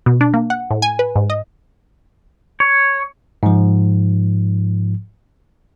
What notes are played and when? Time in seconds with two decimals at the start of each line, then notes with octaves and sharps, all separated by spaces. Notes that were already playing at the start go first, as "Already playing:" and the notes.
0.06 B2
0.21 D4
0.34 A#3
0.50 F#5
0.71 A2
0.82 G#5
0.99 B4
1.16 G#2
1.30 D#5
2.60 C#5
3.43 G#2 F3